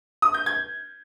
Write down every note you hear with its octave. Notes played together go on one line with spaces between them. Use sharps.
D#6
G6
G#6